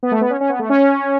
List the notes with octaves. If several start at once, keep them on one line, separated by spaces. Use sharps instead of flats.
B3
A3
B3
C#4
C#4
B3
A3
C#4